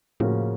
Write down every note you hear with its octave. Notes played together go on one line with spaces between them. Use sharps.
A2 C#3 F3 A#3 C#4 F#4